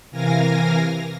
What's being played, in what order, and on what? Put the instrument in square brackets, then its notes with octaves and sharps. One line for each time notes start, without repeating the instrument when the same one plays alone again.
[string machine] C3 E3 A#4 F5 G#5 A#6